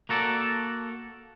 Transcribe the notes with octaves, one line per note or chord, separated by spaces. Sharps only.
A#3 F#4 A4 D5